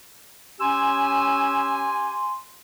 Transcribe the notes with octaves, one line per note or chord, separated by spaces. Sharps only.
C#4 G4 G#5 C6 E6